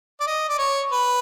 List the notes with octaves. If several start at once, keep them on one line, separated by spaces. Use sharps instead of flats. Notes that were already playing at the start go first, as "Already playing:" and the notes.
D5
D#5
D5
C#5
B4